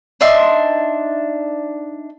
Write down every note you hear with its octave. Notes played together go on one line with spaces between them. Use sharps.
D4 D#4 E5 C6